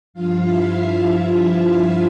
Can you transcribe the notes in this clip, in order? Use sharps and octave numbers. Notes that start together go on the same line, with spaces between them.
G2 F3 F4 F5
E4 E5